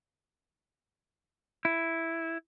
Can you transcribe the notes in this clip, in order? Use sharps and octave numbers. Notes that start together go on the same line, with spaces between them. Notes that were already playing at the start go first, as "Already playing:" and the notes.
E4